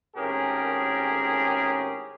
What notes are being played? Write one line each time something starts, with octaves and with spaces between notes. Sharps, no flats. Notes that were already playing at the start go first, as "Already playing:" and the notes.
G#1 A2 C#4 G4 G#4 A#4